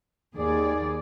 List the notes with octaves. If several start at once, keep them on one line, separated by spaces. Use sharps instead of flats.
D#2 G#4 D5